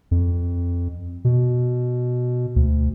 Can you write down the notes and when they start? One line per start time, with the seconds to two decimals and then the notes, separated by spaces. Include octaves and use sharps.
0.11 F2
1.25 B2
2.56 D2